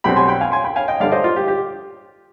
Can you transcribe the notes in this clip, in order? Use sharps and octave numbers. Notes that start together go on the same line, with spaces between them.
B1 B2 G3 C4 G5 B5
G#5 C6
G5 B5
F5 G#5
G#5 C6
G5 B5
F5 G#5
D#5 G5
G2 D3 G3 D5 F5
C5 D#5
F4
G4
G4